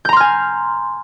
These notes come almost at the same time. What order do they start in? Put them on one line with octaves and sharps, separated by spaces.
G6 A#5 C6 F6 G#5